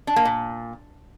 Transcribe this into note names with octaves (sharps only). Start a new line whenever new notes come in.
D4
A#3
A#2